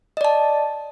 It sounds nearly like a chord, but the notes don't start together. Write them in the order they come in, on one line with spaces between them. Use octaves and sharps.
D#5 D5 A5